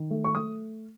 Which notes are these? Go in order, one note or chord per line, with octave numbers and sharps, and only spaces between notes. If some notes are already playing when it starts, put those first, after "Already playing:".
Already playing: D#3
A3
C#6
A3 D#6